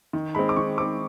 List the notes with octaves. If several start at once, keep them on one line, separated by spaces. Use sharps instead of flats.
D#3
G#3 C4 B5
D6
D#3 C#6
G#3 C4 D6